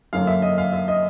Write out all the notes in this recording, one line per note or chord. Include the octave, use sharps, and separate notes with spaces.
F#2 D3 F#3 A#3 F5
E5
D#5
F5
E5
D#5